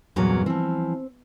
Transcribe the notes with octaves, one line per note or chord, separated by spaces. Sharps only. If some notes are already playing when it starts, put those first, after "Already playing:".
E2 G2 A#2 F#3 C#4
E3 F3 C4